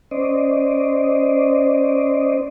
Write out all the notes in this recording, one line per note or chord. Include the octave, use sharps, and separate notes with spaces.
C#4 C5 D5 D#5